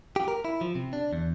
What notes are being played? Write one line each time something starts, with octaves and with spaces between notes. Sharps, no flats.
G4
A#4
E4
F3
C3
D4
E2